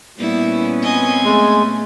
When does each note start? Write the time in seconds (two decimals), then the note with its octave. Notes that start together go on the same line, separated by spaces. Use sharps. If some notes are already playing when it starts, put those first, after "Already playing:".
0.18 A#2 G3 A#3 B3 C#4 E4
0.82 C4 D#5 G#5
1.25 G#3 A3